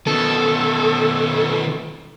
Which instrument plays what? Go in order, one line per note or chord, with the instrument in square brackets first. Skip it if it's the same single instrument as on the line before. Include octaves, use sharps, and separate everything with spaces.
[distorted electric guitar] B2 D#3 [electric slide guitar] A4